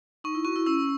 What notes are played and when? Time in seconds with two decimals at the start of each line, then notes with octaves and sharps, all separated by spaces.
0.24 D#4 C#6
0.35 E4
0.45 F#4 C#6
0.56 E4
0.66 C#4 E6